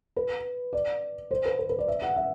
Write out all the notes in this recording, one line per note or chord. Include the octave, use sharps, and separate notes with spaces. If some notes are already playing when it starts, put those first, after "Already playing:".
B4
D5
C5
B4
B4
B4
D5
E5
F#5
E5